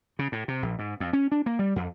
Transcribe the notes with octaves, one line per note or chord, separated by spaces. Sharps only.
C#3
A2
C3
A#1
G#2
F2
C#4
D4
A#3
G3
F2